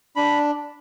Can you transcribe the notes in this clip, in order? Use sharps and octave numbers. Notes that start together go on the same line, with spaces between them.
D4 B5